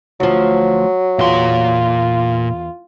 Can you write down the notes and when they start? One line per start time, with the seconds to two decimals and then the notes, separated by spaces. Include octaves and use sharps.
0.20 D2 F3 F#3
1.19 E2 A#2 F4 C6